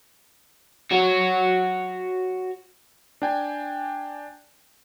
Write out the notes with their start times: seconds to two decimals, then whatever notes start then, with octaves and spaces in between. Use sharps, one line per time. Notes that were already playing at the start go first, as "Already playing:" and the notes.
0.92 F#4 C#5
3.22 D4 G5 G#5